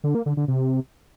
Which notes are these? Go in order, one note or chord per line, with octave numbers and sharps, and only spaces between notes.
D3
A#3
D3
D3
C3